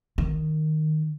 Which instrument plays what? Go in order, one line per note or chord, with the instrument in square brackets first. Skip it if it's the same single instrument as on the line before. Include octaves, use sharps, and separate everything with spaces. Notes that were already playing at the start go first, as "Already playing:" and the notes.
[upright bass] D#3